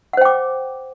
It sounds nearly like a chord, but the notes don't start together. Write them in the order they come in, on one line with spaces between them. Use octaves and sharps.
F#5 C5 G5 D6